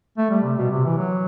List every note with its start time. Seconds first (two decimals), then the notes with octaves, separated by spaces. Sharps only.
0.18 A3
0.30 G3
0.43 C3
0.58 B2
0.71 C3
0.85 E3
0.97 F#3